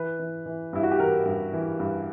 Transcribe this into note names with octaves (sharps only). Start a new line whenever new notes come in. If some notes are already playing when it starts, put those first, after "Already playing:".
Already playing: E3 B4
E3
E3
G2 E4
F#4
G4
E3 A#4
G2
E3
G2